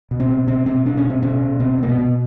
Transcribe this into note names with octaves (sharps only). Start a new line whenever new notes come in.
B2
C4
B2
B2 C4
B2 C4
B2 D4
C#4
B2
C4
B2 C#4
B2
B2 C4
B2 A#3
B3
B2